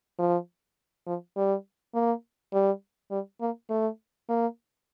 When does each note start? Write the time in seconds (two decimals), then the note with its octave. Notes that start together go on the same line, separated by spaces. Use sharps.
0.19 F3
1.07 F3
1.37 G3
1.94 A#3
2.53 G3
3.11 G3
3.41 A#3
3.70 A3
4.29 A#3